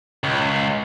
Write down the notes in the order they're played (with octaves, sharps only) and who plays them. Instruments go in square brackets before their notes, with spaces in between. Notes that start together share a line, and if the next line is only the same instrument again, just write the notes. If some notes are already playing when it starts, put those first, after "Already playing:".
[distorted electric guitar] C#2